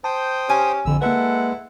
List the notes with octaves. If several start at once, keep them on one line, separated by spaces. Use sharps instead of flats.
C5 G5 A5 D#6
C#4 G4 G#5
A#1 F2 D3 E6
G#3 A#3 E4 A4 B4 F#5